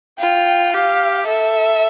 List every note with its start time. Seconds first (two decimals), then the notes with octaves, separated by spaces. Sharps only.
0.20 F4 G5
0.74 G4 F5
1.27 A4 E5